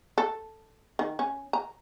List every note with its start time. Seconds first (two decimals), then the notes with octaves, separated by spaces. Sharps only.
0.18 A4
0.99 D#3
1.19 C#4
1.53 A#5